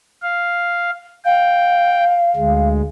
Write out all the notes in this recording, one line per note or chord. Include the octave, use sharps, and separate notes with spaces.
F5
F5 G5
D2 G#3